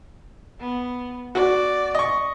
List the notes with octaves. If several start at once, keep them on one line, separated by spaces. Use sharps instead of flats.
B3
F#4 D5
D#5 C#6